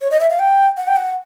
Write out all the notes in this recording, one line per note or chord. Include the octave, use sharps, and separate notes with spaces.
C#5
D#5
E5
F5
G5
F#5
G5
F#5